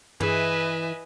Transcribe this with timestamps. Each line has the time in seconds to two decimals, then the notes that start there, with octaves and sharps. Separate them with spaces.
0.20 G2 E3 G#4 B4 D#5 E5 G#5